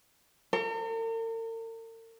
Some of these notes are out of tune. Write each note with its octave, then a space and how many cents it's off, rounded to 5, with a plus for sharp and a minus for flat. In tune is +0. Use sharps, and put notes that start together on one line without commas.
A#4 -45